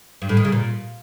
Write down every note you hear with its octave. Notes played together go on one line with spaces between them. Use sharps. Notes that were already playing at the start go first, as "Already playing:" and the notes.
G2
A2
D#3
C#3
A#2